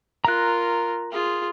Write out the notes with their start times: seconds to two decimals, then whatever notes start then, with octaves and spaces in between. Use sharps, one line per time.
0.25 F4 A#4 A#5 F#6
1.12 F4 G#4